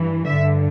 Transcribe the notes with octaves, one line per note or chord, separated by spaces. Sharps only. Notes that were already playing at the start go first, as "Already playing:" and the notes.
Already playing: G2 E3
G2 D3 E5